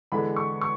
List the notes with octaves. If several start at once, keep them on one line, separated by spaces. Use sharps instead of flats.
E2 D3 G#3 B5
C#6
C#6